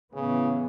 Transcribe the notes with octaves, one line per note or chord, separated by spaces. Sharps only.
A2 C#3 E3 B3